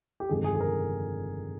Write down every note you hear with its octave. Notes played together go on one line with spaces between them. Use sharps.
G4
G1 F2 C3 D#3 G#3 G#4
G#4
G#4
A#4